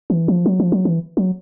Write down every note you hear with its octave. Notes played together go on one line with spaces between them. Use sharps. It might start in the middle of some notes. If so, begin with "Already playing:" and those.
E3
F3
F#3
F3
F#3
E3
F#3